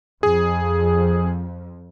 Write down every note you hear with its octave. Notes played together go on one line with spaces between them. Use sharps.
F2 G#4